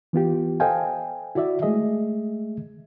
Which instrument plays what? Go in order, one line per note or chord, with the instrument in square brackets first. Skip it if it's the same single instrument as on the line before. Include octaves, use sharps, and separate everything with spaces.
[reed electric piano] E3 B3 F4 G4
A4 C5 D#5 F5 G5 G#5
E4 F#4 D5 E5
G#3 A3 G#4 D#5 E5